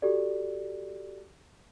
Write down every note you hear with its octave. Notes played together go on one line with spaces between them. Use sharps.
F#4 G4 A4 D5